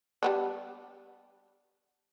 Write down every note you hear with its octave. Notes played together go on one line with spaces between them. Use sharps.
G3 B3 D4